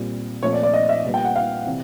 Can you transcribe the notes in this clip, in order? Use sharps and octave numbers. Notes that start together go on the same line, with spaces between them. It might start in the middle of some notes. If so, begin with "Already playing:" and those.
Already playing: A#2 G3 C4
A#2 F3 A3 C4 C#5
D5
D5
D#5
E5
A#2 G3 B3
G5
F#5
F5
C3 E3